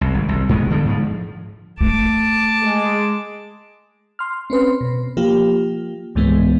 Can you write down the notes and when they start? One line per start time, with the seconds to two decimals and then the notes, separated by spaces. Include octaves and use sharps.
0.01 C2
0.14 G#1
0.29 C2
0.49 A#1 G#2 G#3 B3
0.70 D3 F3 G3
0.85 G#2 F3
1.81 A3 A5 D6
2.63 G#3
4.19 C6 F6
4.50 C4 C#4 B4 C6
4.81 B2
5.17 F3 A#3 F4 G4
6.15 C#2 G#2 E3 G#3 B3